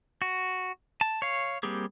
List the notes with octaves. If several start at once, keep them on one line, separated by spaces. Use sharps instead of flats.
F#4
A5
C#5 F5
G3 A#3 C4 G4 G#4